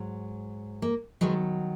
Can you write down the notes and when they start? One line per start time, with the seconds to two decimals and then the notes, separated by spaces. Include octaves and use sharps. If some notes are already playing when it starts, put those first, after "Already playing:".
Already playing: G#2 F#3
0.82 A#3
1.21 D#3 F#3 G#3 B3